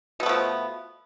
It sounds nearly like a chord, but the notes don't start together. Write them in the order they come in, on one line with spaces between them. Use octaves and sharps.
B2 B3 A3 F3